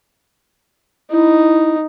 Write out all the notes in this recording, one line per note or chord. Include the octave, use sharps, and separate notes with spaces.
D#4 E4